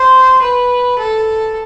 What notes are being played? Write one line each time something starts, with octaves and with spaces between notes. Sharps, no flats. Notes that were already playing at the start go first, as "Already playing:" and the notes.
Already playing: C5
B4
A4